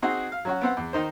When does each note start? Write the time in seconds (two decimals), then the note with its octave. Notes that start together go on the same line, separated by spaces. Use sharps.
0.02 C4 D#4 F#4 G#4
0.32 F5
0.45 F#3 C#4 F#4
0.61 B3 C4 F#5
0.77 E2
0.93 D#3 D#4 C5